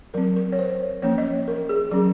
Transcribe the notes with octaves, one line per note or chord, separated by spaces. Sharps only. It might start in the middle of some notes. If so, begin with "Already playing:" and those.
F#3 C4 A#4
A#4
C#5
C5
F3 A#3 C#4 C#5
D#5
A#4
G#4
F#3 C#4 G#4